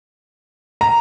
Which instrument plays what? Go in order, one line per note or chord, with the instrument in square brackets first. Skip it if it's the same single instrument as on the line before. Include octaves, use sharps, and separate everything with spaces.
[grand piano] A#5